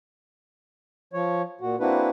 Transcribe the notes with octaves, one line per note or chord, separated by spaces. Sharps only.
F3 C#5
A#2 F#4
A#3 C4 D4 E4 F#4 B4